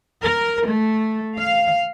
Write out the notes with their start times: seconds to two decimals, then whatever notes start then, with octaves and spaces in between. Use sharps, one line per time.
0.22 A#4
0.68 A3
1.37 F5